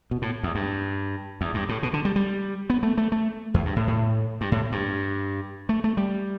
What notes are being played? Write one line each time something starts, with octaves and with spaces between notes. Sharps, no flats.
B2
A2
E2
G2
E2
G2
A2
B2
D3
G3
G3
B3
A3
A3
A3
E2
G2
A2
A2
G2
A2
G2
A3
A3
G3